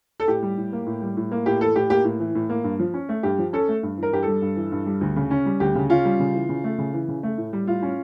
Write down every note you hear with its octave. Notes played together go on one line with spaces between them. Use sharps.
A4
A2 G4
G3
A2
A#3
A2
G3
A2
A#3
A2 G4
E3 A4
A2 G4
A#3 G4
A2
E3
A2
A#3
G2
F3
C#4
A3
G2 G4
F3
C#4 A4
A3
G2
E3
A#4
G2 G4
G3 A4
G2
E3
G2
G3
D2
C#3
C#4
G3
D2 G4
C#3
C#4 F4
G3
C#3
E3
C#3
A3
C#3
E3
C#3
A3
A2
G3
A2 F4
C#4